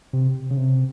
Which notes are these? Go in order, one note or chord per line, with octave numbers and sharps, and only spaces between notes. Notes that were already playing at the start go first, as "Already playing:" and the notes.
C3
C#3
C3